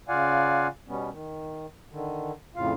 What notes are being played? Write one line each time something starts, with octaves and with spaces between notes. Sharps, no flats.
C#3 F4 D5 F5 F#5 G#5
B2 G3 B3 C#4
D#3
D3 D#3
F2 A2 C#3 F4 F5